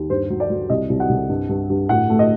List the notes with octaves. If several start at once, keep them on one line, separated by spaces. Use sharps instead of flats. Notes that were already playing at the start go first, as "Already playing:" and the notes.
Already playing: D#2
G2 C5
F#3
D5
F#3
C2 D#5
C2
F#5
C2
G2
G2
G2
A2 F#5
A3
D#5